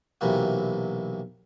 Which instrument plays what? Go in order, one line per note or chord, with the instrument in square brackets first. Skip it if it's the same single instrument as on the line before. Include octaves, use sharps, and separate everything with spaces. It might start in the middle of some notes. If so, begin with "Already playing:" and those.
[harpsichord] B1 C3 E3 A#3 F#4